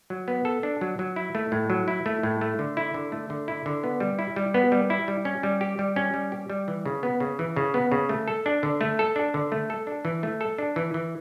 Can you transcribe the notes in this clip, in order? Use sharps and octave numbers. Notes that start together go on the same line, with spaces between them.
F#3
B3
A4
D4
F#3
F#3
E4
A3
A2
F#3
E4
A3
A2
A3
D3
E4
D3
A3
D3
E4
D3
B3
G3
E4
G3
B3
G3
E4
G3
C#4
G3
G4
G3
C#4
G3
G4
G3
E3
C#3
B3
C#3
E3
C#3
B3
C#3
A3
A4
D4
D3
A3
A4
D4
D3
A3
A4
D4
E3
A3
A4
D4
E3
E3